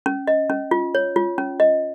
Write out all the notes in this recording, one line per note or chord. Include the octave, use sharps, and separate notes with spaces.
C#4
D#5
C#4
F4
C#5
F4
C#4
D#5